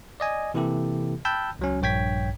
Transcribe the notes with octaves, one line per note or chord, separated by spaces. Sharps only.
D5 D#5 G#5
C3 E3 A#3 E4 G4 A4
G5 A5 B5 E6 F#6 G6
C#2 F#3 C#4
A#1 G2 C#5 G5 G#6 B6